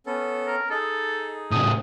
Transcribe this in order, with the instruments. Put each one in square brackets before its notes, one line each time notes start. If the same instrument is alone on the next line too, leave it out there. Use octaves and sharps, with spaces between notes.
[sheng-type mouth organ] B3 C#4 A4
[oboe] A#4
[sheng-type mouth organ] D#4 G#4 [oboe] A4
[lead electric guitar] A2 C#3 [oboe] D#6